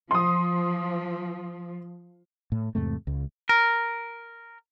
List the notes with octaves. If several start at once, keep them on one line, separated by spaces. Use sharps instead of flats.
F3 C6 D#6
A2
E2 G#2 C3 A3
C#2
A#4